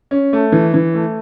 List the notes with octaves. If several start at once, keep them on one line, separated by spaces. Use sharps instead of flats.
C#4
A3
E3
E3
A3